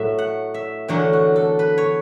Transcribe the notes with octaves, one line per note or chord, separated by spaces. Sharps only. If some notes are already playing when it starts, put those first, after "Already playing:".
Already playing: A2 F#3 E5
F#5
E5
E2 D3 F#3 C#5
F#4
A4
B4
C#5